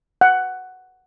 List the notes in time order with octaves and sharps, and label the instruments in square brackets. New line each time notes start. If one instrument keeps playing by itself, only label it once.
[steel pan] F#5